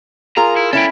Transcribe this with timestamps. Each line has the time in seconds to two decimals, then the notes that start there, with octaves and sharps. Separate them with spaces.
0.37 F4 G#4 A#4 A#5
0.56 E4
0.73 C#4 E4 A4 G5